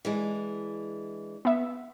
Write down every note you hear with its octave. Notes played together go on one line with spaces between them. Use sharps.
E3 G#3 D4
B3 E5